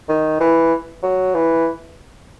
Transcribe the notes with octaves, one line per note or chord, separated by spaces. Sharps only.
D#3
E3
F#3
E3